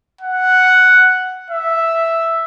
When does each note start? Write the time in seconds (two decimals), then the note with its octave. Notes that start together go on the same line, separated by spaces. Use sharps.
0.21 F#5
1.51 E5